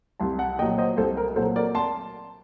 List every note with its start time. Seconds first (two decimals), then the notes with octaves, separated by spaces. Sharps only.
0.20 C2 A5 C6
0.39 F#5 A5
0.59 A#2 F#3 D#5 G5
0.78 C5 D#5
0.97 C2 A4 C5
1.17 A#4
1.36 A#2 F#3 A4 C5
1.56 A#4 D5
1.75 A5 C6